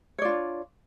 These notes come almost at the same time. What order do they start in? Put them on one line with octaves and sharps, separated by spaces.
C#5 D5 F4 D4